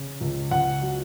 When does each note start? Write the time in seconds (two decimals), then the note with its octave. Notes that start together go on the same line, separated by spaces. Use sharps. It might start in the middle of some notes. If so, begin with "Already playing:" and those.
Already playing: C#3
0.21 C#2
0.51 C#2 F#5
0.82 F#3